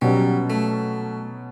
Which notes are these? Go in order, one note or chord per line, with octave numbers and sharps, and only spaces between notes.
B2 F#3 G3 C#4
A3